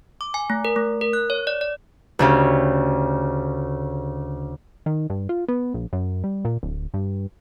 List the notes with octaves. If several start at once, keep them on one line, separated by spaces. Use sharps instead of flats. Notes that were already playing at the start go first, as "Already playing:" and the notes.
D6
G#5
A3
A#4
A3
A#4
F#6
C#5
D5
D5
D2 C#3 G4
D#3
G2
F4
B3
A#1
F#2
G3
A#2
D1
G2